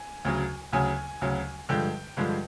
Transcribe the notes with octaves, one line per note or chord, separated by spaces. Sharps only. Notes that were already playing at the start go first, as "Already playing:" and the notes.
Already playing: G#5
D2 C#3 F#3
D2 C#3 F#3 G#5
D2 C#3 F#3
G2 D3 F3 G#3 G5
G2 D3 F3 G#3